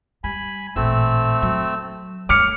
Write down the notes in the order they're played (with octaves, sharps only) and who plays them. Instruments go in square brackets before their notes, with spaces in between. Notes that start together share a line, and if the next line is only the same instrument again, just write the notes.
[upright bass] G3 [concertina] G#5 B5
[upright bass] A1 A#2 [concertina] A3 C4 E6
[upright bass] F#3
[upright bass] G2 A3 [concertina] C#5 [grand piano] D6 F6 C#7